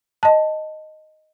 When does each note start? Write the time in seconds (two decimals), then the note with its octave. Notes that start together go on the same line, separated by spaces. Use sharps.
0.23 D#5 A5